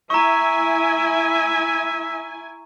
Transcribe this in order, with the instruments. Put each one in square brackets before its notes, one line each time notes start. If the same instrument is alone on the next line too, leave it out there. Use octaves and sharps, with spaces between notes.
[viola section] E4 G#5 [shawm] E5 [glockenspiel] A#5 C#6